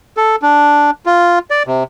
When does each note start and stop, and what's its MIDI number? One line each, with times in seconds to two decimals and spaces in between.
0.17 0.36 69
0.42 0.91 62
1.06 1.39 65
1.50 1.63 74
1.67 1.83 48